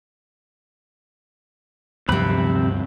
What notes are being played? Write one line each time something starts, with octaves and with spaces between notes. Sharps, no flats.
D2 G2 C3 F3 F#3 C4 B5 F#6